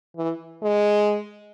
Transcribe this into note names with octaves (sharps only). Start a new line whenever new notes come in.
E3
G#3